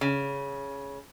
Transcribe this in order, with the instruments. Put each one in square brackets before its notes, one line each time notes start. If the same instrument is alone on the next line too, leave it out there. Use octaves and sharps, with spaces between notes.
[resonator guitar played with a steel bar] C#3